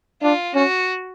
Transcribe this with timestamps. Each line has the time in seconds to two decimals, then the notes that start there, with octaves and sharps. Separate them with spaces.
0.22 D4 F4
0.55 C#4 F#4